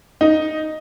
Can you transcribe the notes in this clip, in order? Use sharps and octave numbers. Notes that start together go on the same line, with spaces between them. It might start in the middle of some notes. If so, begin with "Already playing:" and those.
D#4